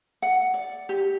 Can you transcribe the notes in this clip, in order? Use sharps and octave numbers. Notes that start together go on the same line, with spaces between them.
F#5
D5
G4